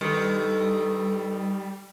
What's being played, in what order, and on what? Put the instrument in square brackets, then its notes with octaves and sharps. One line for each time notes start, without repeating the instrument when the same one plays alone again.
[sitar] G2 D#3 [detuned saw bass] G3 [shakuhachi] A4